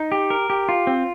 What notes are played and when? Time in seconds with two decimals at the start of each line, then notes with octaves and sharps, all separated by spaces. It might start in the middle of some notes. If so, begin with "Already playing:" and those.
Already playing: D#4
0.12 G4
0.30 A#4
0.50 G4
0.69 F4
0.87 C4